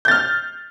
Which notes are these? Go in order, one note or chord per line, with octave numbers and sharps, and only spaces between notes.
F6 G6 A6